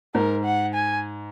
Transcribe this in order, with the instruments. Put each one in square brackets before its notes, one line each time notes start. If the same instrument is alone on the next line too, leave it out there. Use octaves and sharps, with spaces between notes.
[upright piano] G#2 [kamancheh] A#4
[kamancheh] F#5
G#5